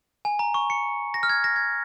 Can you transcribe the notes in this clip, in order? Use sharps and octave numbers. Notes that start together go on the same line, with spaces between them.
G#5
A#5
C#6
C#7
A#6
F6
G#6
A#6
G#6